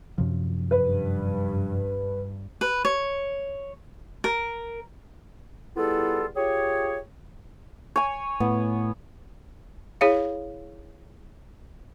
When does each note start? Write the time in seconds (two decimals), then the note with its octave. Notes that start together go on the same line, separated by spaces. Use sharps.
0.18 F#2 C3 F3
0.71 G2 B4
2.61 B4
2.85 C#5
4.24 A#4
5.76 G3 B3 E4 F4 G#4 A4
6.36 F4 G4 G#4 C#5
7.96 C#5 G#5
8.40 A2 B3
10.01 E4 G#4 C#5 F5